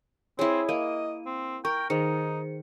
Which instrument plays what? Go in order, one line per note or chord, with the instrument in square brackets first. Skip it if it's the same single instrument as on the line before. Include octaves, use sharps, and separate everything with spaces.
[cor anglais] C4 [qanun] E4 G#4 [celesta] C#5
[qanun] A#3 [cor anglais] D#5 [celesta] D#7
[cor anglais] C4
[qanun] A#4 [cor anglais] G5 [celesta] C#6
[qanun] D#3 [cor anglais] D#4 [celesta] G#4 C5 C#7